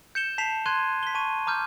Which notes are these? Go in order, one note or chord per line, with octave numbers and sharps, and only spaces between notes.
G6 C#7 E7 G7
A5 B6 C7 E7 F7
C6 F#6 G#6 D#7 G7
B6 G7
A5 C#6 D#7 G7
A#5 D6 F6 G6